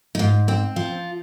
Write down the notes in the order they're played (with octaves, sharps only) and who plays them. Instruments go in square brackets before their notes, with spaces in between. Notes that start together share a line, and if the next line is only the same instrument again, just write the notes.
[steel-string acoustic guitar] D#4
G#2 F4
C4
F3 F4